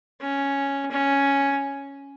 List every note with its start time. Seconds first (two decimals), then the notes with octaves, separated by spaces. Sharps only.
0.22 C#4
0.91 C#4